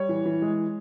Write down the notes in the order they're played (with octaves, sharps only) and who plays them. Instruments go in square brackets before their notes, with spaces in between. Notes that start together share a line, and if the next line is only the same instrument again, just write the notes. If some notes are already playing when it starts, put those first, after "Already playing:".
Already playing: [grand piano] G3 C#5
E3
E3
G#3